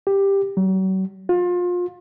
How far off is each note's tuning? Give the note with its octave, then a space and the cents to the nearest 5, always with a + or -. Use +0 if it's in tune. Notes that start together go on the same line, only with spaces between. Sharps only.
G4 +10
F#3 +40
F4 +30